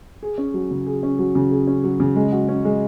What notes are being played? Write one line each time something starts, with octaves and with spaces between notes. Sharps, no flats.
G#4
C#4
F#3
C#3
G#4
C#4
F#3
C#3
G#4
C#4
F#3
C#3
G#3
F#4
C#4
G#3